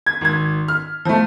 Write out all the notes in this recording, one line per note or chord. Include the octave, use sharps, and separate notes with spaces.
G#6
G#1 G#6
F6
F3 A3